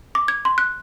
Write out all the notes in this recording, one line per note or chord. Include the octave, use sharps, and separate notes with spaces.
D6
G#6
C6
F#6